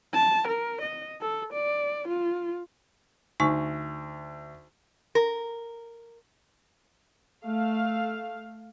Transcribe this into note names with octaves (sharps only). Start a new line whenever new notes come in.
A5
A#4
D#5
A4
D5
F4
D2 D#4 G#5 C#6
A#4
A3 F5